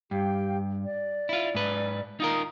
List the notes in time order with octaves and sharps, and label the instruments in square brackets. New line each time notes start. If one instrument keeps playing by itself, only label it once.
[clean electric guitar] G2 [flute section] G4 F5 G5
[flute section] D5
[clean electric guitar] E4 F4
G#2 B4
[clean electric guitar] D#4 F4 A#4 [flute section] D#6